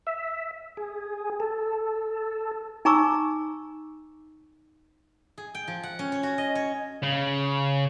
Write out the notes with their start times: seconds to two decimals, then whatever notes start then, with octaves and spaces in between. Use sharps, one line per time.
0.07 E5
0.77 G#4
1.40 A4
2.85 D#4 G#5 A#5 C#6 D6 E6
5.38 G#4
5.55 G5
5.68 F3
5.83 F#5
5.99 C#4
6.12 C#5
6.23 F#4
6.38 D#5
6.55 C#5
7.03 C#3